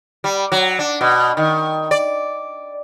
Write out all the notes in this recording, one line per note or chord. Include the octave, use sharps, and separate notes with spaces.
G3
F#3
D4
B2
D#3
D5